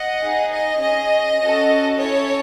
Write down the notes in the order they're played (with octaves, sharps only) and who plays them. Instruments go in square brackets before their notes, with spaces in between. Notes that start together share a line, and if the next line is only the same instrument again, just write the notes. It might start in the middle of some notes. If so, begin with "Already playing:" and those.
Already playing: [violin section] D#5 F#5
D#4 G#4
D#5
C#4 G#4 D#5
C#4 F#4 A4
C#4 E4 A4 C#5